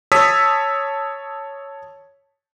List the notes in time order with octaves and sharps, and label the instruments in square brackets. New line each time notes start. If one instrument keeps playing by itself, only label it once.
[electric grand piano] C#5 A5 D#6 E6 B6